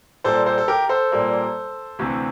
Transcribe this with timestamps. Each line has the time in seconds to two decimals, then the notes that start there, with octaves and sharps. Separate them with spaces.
0.24 A#2 G3 A#3 A4 C5
0.46 A4 C5
0.58 A4
0.68 G4 A#4
0.89 A4 C5
1.12 A#2 G3 A#3
1.99 D2 C3 E3